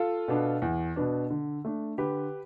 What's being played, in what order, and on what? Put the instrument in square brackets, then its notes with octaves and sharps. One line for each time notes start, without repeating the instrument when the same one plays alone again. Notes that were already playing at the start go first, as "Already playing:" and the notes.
Already playing: [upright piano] F4 A4
B2 B3 D4
E2
B2 B3 D4
D3
A3 D4
D3 G4 B4